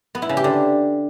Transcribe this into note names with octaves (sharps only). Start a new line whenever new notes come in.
B3
E4
C#3
G4
D3